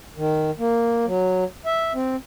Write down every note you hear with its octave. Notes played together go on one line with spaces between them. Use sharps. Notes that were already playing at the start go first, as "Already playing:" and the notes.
D#3
A#3
F#3
E5
C4